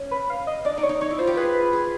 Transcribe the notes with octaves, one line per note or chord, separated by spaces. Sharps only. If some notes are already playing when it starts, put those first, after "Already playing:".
Already playing: C#4
B4
F5
D#5
D4 D5
D#4 D5
C#5
D#4
D#4 C#5
E4
F4 C5
G4
G#4 B4
G#4